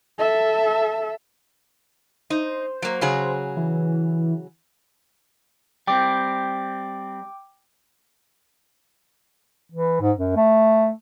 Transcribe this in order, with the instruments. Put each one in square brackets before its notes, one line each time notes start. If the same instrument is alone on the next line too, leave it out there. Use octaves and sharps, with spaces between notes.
[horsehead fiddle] A4 E5
[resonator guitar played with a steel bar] D#4 [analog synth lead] C5
[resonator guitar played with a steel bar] F#3 A#3
C#3 F#3 G#4
[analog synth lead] E3
[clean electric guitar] G3 C4 [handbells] G5 D6
[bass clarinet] E3
G#2
F#2
A3